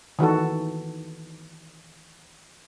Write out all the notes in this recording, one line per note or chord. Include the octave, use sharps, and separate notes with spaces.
D#3 E3 F#4 A4